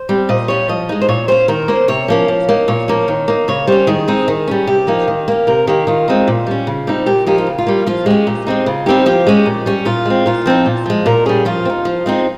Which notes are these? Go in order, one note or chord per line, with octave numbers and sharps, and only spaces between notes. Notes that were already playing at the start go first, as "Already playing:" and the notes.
Already playing: C5
G3 C4
A#2 D#5
G3 C#4 C#5
F3 D#5
G#3 D#4
C5
A#2 C#5
G3 C#4 C5
D#3 A#4
A#3 C#4 C5
C3 C#5
F3 A#3 C#4
F3
A#3 D#4
A#2 C#5
F3 A#3 C#4
D#3
A#3 D#4
C#3 C#5
G3 C#4 C5
D#3 G#4
G#3 C4 D#4
D#3
G3 C#4
C3 G4
F3 A#3 D#4
D#3
A#3 C#4
C3 A#4
D#3 A#3 G4
D#3 F4
G#3 C4 D#4
A#2
G3 C#4
C#3
G3 C4 D#4
A#2 G4
F3 A#3 D#4 G4
F4
C#3
F4
G3 A#3
F3 F4
G#3 C#4 G4
A#2
G#3 C4 D#4
C#3 F4
G3 C4 D#4 G4
F3 G4
G#3 C#4
A#2
G3 C#4
A#2 F4
G#3 C4
A#2 F4
F3 C4 D#4
A#2
F3 G#3
A#2 A#4
G3 C#4 G#4
F3 F4
C4
D#4
F3
G#3 C4 D#4